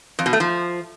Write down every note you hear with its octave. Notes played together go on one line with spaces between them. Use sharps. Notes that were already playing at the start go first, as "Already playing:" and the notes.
F2
B2
A3
F3